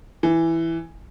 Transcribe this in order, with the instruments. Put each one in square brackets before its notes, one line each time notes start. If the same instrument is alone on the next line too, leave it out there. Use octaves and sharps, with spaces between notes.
[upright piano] E3